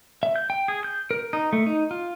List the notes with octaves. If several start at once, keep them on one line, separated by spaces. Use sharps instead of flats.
E5
G6
G5
G#4
G6
A#4
D#4
A3
D#4
F4